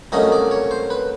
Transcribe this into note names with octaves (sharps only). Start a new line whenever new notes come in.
C2 A#2 F#3 A3 C#4 D#5
D5
C#5
C5
B4